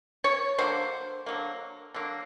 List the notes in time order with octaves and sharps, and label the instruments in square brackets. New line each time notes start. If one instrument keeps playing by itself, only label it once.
[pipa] C#5
D3 F#3 A#3 C5
D3 F#3 A#3
D3 F#3 A#3